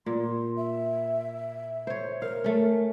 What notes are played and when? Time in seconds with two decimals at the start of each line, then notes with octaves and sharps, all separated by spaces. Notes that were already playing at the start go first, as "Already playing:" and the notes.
0.06 A#2 C6
0.57 E5
1.87 C5 C#5
2.22 A#4 F5
2.44 A3 C#4